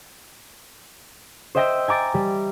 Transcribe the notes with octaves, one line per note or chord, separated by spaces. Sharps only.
C5 D#5 E5 G5 E6 A#6
G#5 A#5 D6 A6 A#6
G3